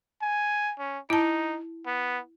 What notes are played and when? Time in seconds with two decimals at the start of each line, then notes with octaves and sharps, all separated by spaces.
0.22 G#5
0.78 C#4
1.10 D#4 E4 A5
1.87 B3